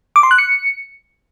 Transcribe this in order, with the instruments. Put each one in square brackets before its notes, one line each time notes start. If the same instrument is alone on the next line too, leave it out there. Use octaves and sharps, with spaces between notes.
[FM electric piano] D6
C6
F#6
C#7